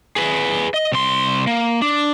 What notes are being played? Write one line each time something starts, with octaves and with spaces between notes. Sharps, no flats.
G#4 B4
D#5
C2 C6
A#3
D4